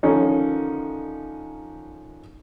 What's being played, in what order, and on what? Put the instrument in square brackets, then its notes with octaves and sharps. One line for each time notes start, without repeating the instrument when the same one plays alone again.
[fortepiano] D3 D#3 F3 C#4 D#4